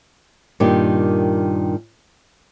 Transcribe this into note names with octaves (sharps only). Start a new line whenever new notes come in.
G2 A#2 D#3 G4